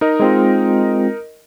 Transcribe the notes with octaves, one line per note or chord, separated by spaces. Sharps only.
D#4 A#4 D#5
G#3 C4 F4